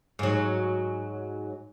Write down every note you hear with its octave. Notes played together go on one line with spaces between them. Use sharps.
G#2 F#3